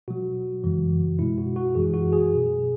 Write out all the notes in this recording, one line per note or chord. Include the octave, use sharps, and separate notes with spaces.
B2 F#3 F#4
F#2 C#3 E3 G#3
B2 G#3 E4
F#4
F#4
F#2 E3 G#3 G#4
F#4
G#4
B2 F#3